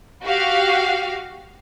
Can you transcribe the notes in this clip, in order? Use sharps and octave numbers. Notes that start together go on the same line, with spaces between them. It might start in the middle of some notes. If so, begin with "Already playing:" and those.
F#4 G4 F5